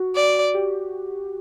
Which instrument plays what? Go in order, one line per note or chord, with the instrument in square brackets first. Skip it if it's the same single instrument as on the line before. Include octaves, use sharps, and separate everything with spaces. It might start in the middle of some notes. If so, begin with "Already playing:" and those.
Already playing: [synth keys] F#4
[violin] D5
[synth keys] G4